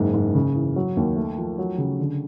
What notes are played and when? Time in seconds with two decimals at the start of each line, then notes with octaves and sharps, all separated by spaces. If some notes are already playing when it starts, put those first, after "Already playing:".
Already playing: F#1 G#2
0.14 G#2
0.34 C#3
0.55 E3
0.76 F#3
0.97 D#2
1.16 A3
1.38 F3
1.58 F#3
1.78 C#3
1.99 D3